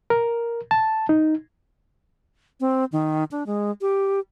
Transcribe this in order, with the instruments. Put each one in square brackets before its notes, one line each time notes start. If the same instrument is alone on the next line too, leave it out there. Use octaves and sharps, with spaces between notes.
[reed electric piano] A#4
A5
D#4
[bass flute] C4
D#3
D4
G#3
G4